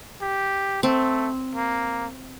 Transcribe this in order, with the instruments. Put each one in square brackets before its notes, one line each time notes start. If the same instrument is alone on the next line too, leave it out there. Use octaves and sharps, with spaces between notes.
[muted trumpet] G4
[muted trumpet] A3 [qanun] C4
[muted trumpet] A#3